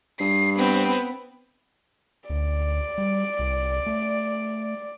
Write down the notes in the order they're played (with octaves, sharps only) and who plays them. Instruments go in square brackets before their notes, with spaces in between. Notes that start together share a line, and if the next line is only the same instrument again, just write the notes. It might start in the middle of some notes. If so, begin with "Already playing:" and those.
[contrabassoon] G2 [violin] C7
[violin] B3 C4
[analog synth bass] D2 [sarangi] D5
[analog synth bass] G3
C2
A3